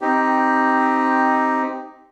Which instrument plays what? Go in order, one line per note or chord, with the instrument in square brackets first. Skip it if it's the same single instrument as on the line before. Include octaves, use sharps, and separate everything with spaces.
[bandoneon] C4 D#4 G4